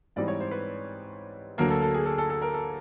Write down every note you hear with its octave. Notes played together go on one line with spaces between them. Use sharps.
G#2 E3 G3 C4 D#4 D5
C#5
C5
B4
D2 D3 F#3 A#3 A#4
A4
A4
G#4
A4
A4
A4
A#4
A4